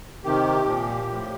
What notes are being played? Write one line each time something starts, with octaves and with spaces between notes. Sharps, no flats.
C3 D#3 G4
A#2 F3
A2 F3